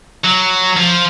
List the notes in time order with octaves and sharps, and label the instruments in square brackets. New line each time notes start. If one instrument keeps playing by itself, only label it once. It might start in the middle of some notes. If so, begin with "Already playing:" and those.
[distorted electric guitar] F#3
F3